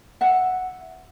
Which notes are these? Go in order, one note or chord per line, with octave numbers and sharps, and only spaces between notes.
E5 F#5